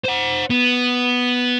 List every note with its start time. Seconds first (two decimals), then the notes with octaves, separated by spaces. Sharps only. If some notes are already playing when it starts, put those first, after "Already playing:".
0.05 C5 F#5
0.50 B3